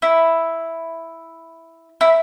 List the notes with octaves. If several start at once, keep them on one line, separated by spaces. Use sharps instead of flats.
E4
E4